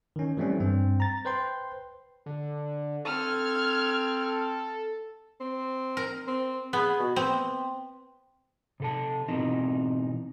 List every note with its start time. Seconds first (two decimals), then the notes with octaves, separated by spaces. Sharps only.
0.16 D#3 C#4
0.37 E3 G3 A3 C4 C#4
0.60 G2 C4
1.00 A#5 A6
1.25 B4 C5 G5 C6
2.26 D3
3.05 C4 A4 F6 G#6
5.40 C4
5.97 A#4
6.27 C4
6.73 B3 G#4
7.00 B2
7.16 B3 C4
8.80 C3 A4 A5
9.28 B2 E3 C4 D#4